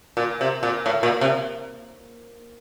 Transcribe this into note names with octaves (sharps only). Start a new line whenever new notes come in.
A#2
C3
A#2
A2
A#2
C3